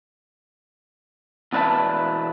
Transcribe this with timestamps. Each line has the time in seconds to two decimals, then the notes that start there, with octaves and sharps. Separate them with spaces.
1.53 E2 B2 B4 D5 E5 A5